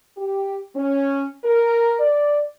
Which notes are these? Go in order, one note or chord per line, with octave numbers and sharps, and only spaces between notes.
G4
C#4
A#4
D5